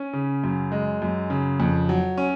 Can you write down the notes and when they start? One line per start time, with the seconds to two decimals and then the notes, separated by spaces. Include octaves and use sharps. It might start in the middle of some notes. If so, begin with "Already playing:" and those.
Already playing: C#4
0.13 C#3
0.44 F#2
0.72 G#3
1.02 F#2
1.30 C#3
1.60 F2
1.89 F#3
2.18 C#4